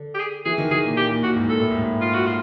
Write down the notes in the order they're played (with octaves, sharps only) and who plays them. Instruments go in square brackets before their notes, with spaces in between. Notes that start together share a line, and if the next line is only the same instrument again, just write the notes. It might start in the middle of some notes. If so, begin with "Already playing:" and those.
Already playing: [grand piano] D3
[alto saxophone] G4
G#4
[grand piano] E3 [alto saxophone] G#4
[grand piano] D#3
[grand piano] D#3 [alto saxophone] G#4
[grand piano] A#2
[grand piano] A#2 [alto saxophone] G4
[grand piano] A#2
[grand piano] A#2 [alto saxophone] F#4
[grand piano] G#2
[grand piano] A#2 [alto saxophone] A4
[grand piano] A2
G#2
A2
[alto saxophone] F4
F#4
F4